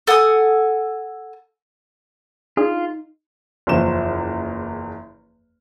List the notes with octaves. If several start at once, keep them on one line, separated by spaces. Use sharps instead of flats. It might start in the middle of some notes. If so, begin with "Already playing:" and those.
A4 F#5 G#5 D#6
D4 D#4 F4 G#4
F#1 E2 F3 E7